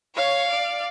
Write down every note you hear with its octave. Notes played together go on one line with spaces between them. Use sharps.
C#5 F5
D5